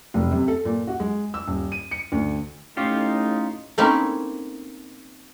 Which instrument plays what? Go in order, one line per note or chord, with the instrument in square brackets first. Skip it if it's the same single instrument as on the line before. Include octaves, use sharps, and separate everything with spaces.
[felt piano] F1
C3
A4
A#2
F#4
G#3
E6
D#1
D#7
C#7
D2
[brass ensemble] A2 D#4 [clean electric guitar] C#4 F4 G4
[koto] A3 A#3 C4 C#4 D#4 E4